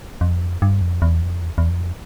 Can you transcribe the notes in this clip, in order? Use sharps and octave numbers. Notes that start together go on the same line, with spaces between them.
F2
G2
F2
E2
F2
E2
E2
F2